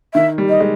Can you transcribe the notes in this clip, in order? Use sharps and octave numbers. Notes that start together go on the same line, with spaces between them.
D#3 E5
G3
D#5
G#3